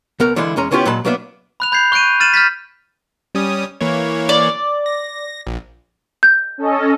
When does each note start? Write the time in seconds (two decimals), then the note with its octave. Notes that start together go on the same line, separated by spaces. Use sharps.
0.20 C#2 B3 A#4
0.36 D3 E3 G#3 E4 F5
0.56 E2 G#3 C#4 A#5
0.71 C#3 B3 C#4 E4 F4 G4
0.86 A#2 F#3 G#3 A5 B5
1.05 F#3 A#3 B3 D4 E5
1.60 B5 F#6 F7
1.72 B5 G6 G#6 C7
1.92 C#6 F#6 G6 D7 D#7
2.20 F6 A6 D#7 E7 F#7
2.34 F6 G6 A6 B6
3.35 G3 C#4 D#6
3.81 E3 A#3 C#5
4.29 D5
4.86 A#6
5.47 A#1
6.23 G6
6.58 C#4 A4 D#5